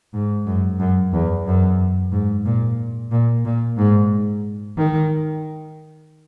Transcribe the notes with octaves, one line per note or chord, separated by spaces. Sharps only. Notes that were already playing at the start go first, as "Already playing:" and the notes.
G#2
F#2
F#2
E2
F#2
G#2
A#2
A#2
A#2
G#2
D#3